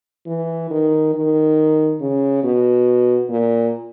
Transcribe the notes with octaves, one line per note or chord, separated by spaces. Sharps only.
E3
D#3
D#3
C#3
B2
A#2